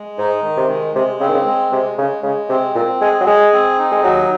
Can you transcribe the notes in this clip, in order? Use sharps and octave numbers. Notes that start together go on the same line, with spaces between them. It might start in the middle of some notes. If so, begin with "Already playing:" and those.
Already playing: G#3
G#2 D#4
D#3
C3
G#3
C3 G#3
C#3 C4
D#3
C#3
G#3
C3 G#3
C#3 G#3
C#3 G#3
C3 C4
A#2 C4
G#3 G#4
F#3
G#3 G#4
C4
D#4
G#3
D#2 F#3